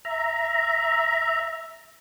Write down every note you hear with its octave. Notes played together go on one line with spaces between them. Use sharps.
E5 A#5